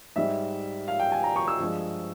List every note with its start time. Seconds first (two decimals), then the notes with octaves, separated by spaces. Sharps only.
0.16 G#2 G3 E5
0.88 F5
1.00 G5
1.12 G#5
1.23 A#5
1.36 C#6
1.48 E6
1.60 G2 F3 G#3